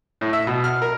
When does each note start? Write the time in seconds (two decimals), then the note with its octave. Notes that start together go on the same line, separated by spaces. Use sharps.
0.21 A2
0.33 E5
0.47 B2
0.64 F6
0.82 A#4